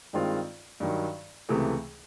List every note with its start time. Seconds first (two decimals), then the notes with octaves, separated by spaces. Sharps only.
0.13 G2 D#3 G#3 C4 F4
0.80 G2 D#3 F#3
1.49 C#2 C3 E3 A3